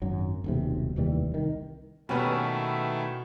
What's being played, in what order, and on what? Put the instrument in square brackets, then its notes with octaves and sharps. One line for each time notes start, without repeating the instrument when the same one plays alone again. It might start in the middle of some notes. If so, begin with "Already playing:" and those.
[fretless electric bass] G#1 F#2 F#3
D#1 B1 C3
F1 D#2 E3 G3
C2 D#3
[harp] B2 B3 [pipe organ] D#3 A3 E4 [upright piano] G3 C#4 B4